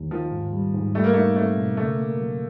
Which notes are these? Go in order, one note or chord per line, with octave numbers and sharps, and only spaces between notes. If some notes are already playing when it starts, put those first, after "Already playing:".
Already playing: D#2
D#3 F3
G#2
G3
G#2
G3 A3
A#3
A3 D#4
A3 C4
B2
C#3 A3
A#3
F#3